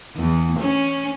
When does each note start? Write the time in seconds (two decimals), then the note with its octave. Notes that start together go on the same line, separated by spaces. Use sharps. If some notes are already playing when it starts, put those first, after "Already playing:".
0.16 E2
0.59 C#4